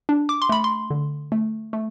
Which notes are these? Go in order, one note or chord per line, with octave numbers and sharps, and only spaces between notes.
D4
D6
C6
A3 B5
C6
D3
A3
A3